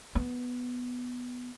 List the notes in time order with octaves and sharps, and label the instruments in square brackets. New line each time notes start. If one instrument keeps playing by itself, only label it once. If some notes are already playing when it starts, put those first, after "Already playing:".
[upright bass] B3